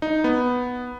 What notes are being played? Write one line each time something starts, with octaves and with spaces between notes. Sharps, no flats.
D#4
B3